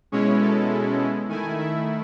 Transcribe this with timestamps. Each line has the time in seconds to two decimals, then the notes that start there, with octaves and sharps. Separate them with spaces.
0.12 B2 G#3 C#4 E4 C#5
0.41 A4
1.29 D#3 A3 E4 G#5
1.59 E5